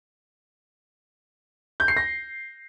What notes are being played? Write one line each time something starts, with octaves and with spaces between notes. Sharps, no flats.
G6
C7
A#6